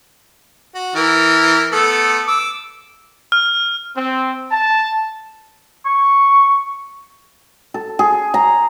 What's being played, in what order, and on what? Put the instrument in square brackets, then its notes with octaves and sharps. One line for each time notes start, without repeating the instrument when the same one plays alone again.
[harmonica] F#4
E3 A#4
A3 B3 A4
D6 E6
[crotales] F6
[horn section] C4
A5
[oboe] C#6
[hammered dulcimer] A4
G#4
A#5